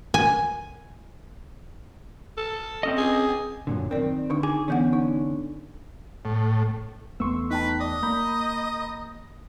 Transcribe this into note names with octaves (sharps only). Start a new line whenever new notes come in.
G#5
A4
C4 C#4 D#5
G#4
F#2 A#2 D3
D#3 C4 A#4 D5
D3 D4 D#4
G#4 D6
D3 E3 B3 C#4 F#5
D#4
A2
E2 A3 B3 C6 C#6 E6
D#4 B4 G5 A5
D5 D#5
A#3 A#5 B5 G6